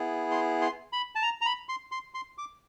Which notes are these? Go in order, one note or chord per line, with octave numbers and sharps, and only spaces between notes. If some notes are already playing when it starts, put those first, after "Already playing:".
Already playing: B3 E4 G#4
C6
C6
B5
A5
A#5
A#5
B5
C6
C6
C6
D6